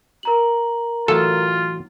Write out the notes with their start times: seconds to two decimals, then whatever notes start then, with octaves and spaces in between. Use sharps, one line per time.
0.23 A#4 A#5 F#7
1.08 A2 E3 F#3 F4 A4